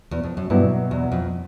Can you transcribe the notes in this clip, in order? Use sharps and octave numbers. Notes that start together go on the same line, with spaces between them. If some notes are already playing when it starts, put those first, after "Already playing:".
E2
F2
F#2
G2 B2 F#3 B3 E4
E2
F2